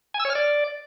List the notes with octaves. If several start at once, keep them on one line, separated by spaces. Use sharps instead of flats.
G#5
E6
C#5
F6
D5